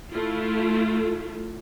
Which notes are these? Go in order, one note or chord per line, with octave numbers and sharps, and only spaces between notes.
A3 E4 F4